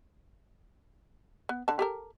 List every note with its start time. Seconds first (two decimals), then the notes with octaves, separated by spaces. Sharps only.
1.49 B3
1.68 D3 A5
1.79 G4 A4 A#4